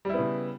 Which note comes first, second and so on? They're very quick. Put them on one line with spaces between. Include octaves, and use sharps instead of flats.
G3 E4 B3 C#3